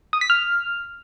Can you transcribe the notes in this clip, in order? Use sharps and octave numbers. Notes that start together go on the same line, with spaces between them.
D#6
B6
F6